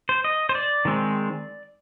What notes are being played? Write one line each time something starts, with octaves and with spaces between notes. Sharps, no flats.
C5
D#5
C5
D5
D#3 G#3 C4